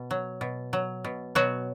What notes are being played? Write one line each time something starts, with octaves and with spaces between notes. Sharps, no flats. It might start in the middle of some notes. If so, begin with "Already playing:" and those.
Already playing: B2
F#3
B2
F#3
B2
B2 F#3 F#4